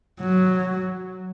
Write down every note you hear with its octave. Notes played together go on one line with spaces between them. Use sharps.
F#3